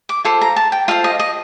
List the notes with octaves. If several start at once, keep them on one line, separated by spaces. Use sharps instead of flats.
D6
F4 A4 C5 C6
A#5
A5
G5
F4 A4 C5 D#5 F5
D#5
D#5